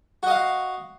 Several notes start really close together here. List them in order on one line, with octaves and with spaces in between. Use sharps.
F#4 D#5 F5